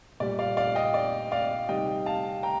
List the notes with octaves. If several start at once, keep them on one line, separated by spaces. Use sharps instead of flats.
A#2 G3 D5
D5 F5
D5 F5
D#5 G5
D5
D5 F5
C3 D#3 G3 D#5 G5
F5 A5
G5 A#5